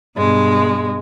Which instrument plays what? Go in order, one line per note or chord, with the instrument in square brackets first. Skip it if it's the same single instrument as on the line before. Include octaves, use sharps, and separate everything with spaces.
[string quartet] G2 B2 G#3